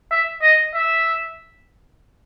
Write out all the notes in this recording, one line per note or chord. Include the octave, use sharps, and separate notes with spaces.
E5
D#5
E5